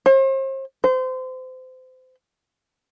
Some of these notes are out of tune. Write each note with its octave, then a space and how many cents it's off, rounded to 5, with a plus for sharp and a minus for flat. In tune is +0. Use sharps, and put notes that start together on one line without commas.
C5 +40
C5 -30